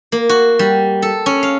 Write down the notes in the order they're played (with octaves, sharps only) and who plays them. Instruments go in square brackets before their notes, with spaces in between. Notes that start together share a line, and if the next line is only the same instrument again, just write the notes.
[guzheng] A#3
F#4
G3
A4
C#4
F5